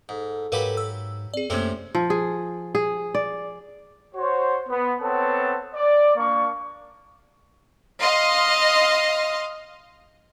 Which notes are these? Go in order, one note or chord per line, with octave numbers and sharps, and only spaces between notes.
G#2 A4
G#2 F#3 G4 A#4 B4 F5 B5
E6
C4 G#4 D5
F#2 C3 A3 A#3 C4 C#4 A4
F3
G#4
G#4
D5
F#4 C5 C#5
B3
B3 C4 A4 C#5 F#5 A5
D5
A#3 D4 C#6
D#5 F5 C6